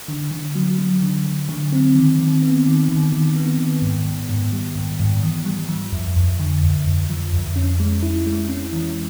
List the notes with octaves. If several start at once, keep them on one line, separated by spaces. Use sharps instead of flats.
D3
D3
F#3
F#3
D3
D3
D3
C4
D#3
D#3
B3
D#3
D#3
D#3
B3
D#3
G#2
G#2
G#2
G3
G#2
G#2
E3
G3
F3
F2
F2
D3
F2
F2
F3
F2
C#4
G#3
E4
G#3
C#4
E3